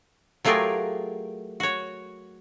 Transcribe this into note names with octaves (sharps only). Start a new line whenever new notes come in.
F#3 A3 F4 G4 G#4 A#4
F#4 C#5